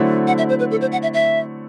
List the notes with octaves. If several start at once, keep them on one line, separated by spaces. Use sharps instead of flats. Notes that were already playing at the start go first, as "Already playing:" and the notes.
Already playing: D3 F#3 A3 C4 E4
F#5
E5
C5
B4
A4
C5
F#5
E5
E5